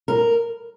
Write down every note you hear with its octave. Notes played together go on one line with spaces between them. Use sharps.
A#4